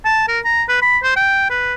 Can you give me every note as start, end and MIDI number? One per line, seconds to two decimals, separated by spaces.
0.05 0.25 81
0.28 0.40 70
0.44 0.63 82
0.69 0.81 71
0.82 0.98 83
1.03 1.14 72
1.16 1.50 79
1.50 1.75 71